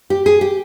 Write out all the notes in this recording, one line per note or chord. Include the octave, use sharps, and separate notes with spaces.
G4
G#4
G4